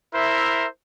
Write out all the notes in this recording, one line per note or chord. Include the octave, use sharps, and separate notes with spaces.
E4 A#4 C5 E5